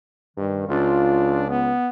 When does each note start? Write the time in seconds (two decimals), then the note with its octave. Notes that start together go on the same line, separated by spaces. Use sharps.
0.37 G2 D#3
0.69 C#2 D4 F4
1.49 B3